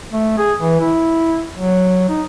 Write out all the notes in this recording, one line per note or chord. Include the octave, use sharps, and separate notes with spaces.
A3
G#4
E3
E4
F#3
D#4